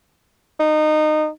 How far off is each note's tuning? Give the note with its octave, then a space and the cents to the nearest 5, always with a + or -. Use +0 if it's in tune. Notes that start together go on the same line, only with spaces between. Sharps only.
D#4 -20